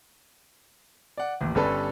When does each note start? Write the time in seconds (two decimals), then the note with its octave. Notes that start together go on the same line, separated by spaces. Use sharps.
1.17 D5 F#5
1.41 A1 D#2
1.55 G1 G2 G3 C#4 A4 B4